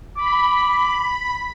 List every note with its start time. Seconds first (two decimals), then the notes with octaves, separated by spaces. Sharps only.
0.17 B5 D6